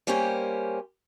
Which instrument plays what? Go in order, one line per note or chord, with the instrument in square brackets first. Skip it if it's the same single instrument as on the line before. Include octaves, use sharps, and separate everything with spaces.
[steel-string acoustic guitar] G3 A#3 C#4 G4 C5